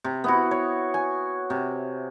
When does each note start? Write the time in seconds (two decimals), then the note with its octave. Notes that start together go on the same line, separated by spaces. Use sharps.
0.04 C3
0.24 B3 E4 F#4
0.51 C#5
0.94 G#5
1.50 C3